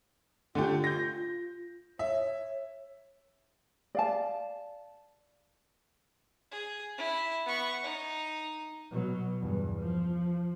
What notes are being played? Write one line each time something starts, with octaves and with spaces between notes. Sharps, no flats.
D3 A3 F4 G4
G6 A#6
C#5 E5
D5 F5 A5
G#4
E4
B3 C#6
D#4
B2 F#3
E2 G2
F3